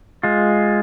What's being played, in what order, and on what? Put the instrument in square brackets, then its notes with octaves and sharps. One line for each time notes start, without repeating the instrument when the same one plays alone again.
[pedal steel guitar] G#3 F4